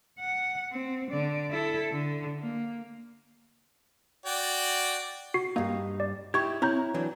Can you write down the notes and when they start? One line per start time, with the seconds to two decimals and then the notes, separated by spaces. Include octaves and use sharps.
0.20 F#5
0.73 C4
1.11 D3 D5
1.51 E4 A4
1.92 D3
2.41 A#3
4.26 F#4 D5 G5
5.34 F#4 C7
5.56 G2 A#3 D#4
6.00 D5
6.34 D#4 E4 G4 C#6 G#6
6.62 C4 E4 C#5 A#5 G6
6.94 E3 F#3 D4